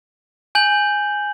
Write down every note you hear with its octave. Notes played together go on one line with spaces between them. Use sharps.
G#5 G6 F#7